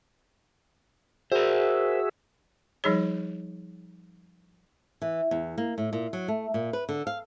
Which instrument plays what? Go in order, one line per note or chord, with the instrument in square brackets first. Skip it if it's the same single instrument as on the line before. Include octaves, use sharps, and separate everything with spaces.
[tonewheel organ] F#4 G#4 E5 [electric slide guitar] A#4 C5
[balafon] F3 G3 D#4 G#4 C#5
[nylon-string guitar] E3
E2
A#3
A2
A#2
F#3
A3
A#2
B4
D3
F5